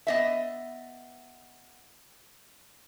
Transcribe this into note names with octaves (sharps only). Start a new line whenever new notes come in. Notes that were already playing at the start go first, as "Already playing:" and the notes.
B3 D#5 E5